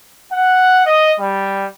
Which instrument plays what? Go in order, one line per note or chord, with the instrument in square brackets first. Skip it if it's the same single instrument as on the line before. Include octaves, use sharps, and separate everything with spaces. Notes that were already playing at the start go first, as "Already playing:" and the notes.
[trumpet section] F#5
D#5
G3